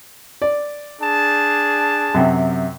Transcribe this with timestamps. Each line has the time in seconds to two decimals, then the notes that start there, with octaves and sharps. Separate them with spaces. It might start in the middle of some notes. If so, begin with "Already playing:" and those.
0.42 D5
1.01 D4 G#4 A5
2.14 F#2 C3 G5